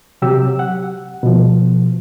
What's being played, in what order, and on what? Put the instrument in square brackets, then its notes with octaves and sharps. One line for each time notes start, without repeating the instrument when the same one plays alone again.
[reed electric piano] C3 F#3 G4 E6
F#5
B2 F3